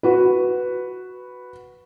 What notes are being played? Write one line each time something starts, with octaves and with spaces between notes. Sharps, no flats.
F#4 B4